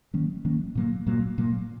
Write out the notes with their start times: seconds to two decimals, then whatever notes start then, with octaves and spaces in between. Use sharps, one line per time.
0.14 D#3 F#3 A#3 C#4
0.45 D#3 F#3 A#3 C#4
0.75 A#2 F#3 A#3
1.07 A#2 F#3 A#3
1.38 A#2 F#3 A#3